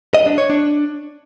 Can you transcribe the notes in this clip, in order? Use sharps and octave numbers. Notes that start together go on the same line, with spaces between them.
D#5
D4
C#5
D4